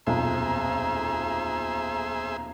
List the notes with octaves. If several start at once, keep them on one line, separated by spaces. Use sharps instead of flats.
D#1 B1 F2 G#4 C5 E5 A#5